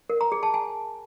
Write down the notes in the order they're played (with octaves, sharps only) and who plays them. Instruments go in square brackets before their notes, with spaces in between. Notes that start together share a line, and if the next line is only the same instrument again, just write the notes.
[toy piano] A#4
A#5
G#4
A5
G#5